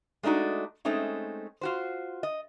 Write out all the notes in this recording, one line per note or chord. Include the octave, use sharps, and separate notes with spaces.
G#3 A3 D4 D#4 F#4
G#3 A3 C4 C#4 D#4
F4 F#4 C5
D#5